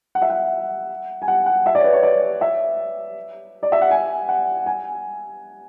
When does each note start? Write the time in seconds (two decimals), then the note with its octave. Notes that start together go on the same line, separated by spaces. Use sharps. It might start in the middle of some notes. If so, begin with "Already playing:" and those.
0.15 F#5
0.22 E5
0.30 F#5
1.22 G#5
1.28 F#5
1.46 F#5
1.66 E5
1.75 D5
1.79 C#5
1.84 B4
1.93 C#5
2.03 D5
2.41 E5
3.63 D5
3.72 E5
3.81 F#5
3.91 G#5
4.29 F#5
4.66 G#5